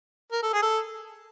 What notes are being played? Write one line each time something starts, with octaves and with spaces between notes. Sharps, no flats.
A#4
A4
G#4
A4